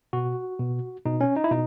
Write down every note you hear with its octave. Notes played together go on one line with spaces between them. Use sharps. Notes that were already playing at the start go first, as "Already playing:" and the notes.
B2 F#4
B2
B2 D#4
C#4
D#4
E4
B2 D#4